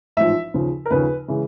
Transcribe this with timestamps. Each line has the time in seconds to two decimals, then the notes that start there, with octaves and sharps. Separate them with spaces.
0.17 A1 G#2 F3 E5
0.54 D#2 C#3 F3
0.86 A#4
0.90 D#2 C#3 F3 B4
1.28 C#3 E3 G#3